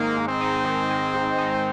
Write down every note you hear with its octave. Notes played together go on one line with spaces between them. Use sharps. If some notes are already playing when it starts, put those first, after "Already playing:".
Already playing: G#2 D#3 G#3 A#3 D#4
G#2
C4
D#4
D#3
G#3
G#2
D#4